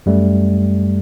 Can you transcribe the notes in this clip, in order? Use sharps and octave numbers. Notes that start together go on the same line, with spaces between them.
F#2 G3 A3